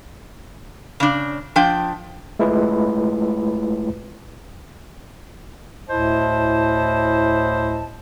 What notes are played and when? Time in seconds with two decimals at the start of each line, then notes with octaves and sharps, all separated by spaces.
1.00 C#3 D4
1.56 F3 D4 G5
2.39 G#3 A3 E4 F4 B4
5.89 D2 A2 E4 C5 D#5 A5